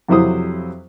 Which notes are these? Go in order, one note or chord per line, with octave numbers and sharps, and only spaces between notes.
F2 C3 F#3 E4 C5 D#6